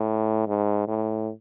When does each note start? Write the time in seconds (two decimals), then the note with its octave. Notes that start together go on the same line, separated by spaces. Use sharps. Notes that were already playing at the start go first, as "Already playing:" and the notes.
Already playing: A2
0.47 G#2
0.88 A2